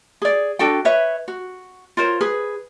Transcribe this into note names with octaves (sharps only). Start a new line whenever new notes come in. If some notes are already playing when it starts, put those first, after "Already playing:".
G#4 D5
D4 F#4 A4 G5
B4 C#5 E5
F#4
F4 A#4 C5 C#5
G#4 B4